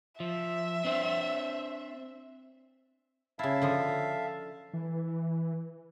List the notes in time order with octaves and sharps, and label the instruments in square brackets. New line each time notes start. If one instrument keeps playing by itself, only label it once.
[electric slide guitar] F3 [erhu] E5
[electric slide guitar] C4 D4 C5
[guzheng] C#3 E4 [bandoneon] E5 F5 A5
[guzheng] D3 F3 D#5
[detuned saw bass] E3